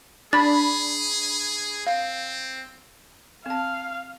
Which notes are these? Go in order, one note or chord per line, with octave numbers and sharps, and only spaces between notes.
D4 G#4 B5 A6
C4 F5
C4 F5 A5